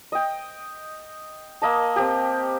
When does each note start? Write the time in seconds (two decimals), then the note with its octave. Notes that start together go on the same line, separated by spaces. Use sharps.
0.12 D#5 G5
1.62 A#3 D#5 A5
1.96 C4 G4